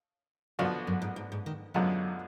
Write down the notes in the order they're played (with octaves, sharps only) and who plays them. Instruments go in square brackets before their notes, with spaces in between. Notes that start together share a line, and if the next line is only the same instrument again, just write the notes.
[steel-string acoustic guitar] F#2 [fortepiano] D3 F3 B3 D4 F#4
[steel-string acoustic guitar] F#2
G#2
G#2
G#2
D#3
[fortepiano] F#2 D3 G#3 B3 F4 [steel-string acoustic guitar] F#3